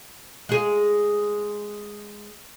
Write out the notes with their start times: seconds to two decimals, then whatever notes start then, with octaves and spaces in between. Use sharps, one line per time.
0.49 G#3 G#4